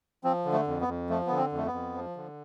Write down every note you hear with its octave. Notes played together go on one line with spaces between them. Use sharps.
F3 C4
D3
A3
F2
B3
F2
F3 A3
D3 B3
C4
F2
A3
B3
F2
F3
D3